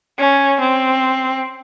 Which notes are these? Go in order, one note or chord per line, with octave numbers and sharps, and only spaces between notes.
C#4
C4